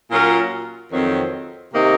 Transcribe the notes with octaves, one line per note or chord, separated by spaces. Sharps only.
A#2 F#3 C#4 F4 A#4
F2 D#3 F#3 C4
C3 D#3 A#3 D#4